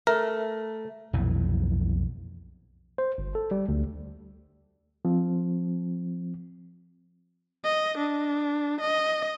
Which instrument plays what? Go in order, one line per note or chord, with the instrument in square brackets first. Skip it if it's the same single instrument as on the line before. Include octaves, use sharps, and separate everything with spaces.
[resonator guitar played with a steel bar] A3 [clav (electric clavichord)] A#4
[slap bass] B1 F2 A#2 E3
[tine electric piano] C5
G1
A4
G3
D2
[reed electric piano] F3 C4
[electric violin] D#5
D4
D#5